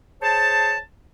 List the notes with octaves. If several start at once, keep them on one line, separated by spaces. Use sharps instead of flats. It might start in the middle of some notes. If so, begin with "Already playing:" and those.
G#4 C5 C#5 A5